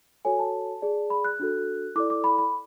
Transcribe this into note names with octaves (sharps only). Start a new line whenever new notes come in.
F#4 A4 C#5 G#5
A5
G#4 D5
B5
F#6
D4 F#4 A4
E4 A4 D5 D6
D6
B5
B5